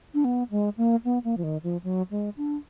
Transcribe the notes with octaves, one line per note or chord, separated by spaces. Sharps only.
D4
B3
G#3
A#3
B3
A#3
F3
D#3
F3
F#3
G#3
D4